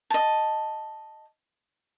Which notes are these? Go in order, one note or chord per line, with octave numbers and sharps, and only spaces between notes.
D#5 A5